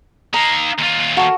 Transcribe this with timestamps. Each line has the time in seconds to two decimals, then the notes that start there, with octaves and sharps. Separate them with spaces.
0.34 D#4 F5 A#5
0.79 D#2 F4
1.17 F#4 A4 A#4